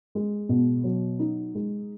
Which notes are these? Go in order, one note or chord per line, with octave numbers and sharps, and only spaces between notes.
G#3
B2
F#3
D#4
G#3